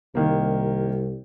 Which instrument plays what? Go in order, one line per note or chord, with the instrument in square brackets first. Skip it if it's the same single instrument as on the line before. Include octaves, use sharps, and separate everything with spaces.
[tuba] C2 [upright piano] D#3 A#3